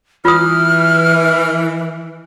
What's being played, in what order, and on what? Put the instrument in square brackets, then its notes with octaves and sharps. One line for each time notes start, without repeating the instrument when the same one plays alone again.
[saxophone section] E3 [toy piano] F4 D#6 [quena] F6